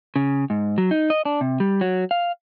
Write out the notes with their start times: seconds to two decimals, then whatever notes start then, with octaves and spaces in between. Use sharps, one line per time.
0.16 C#3
0.50 G#2
0.78 F#3
0.91 D#4
1.10 D#5
1.25 D4
1.41 C3
1.60 G3
1.81 F#3
2.11 F5